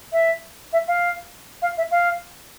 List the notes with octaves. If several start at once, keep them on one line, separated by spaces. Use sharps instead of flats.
E5
E5
F5
F5
E5
F5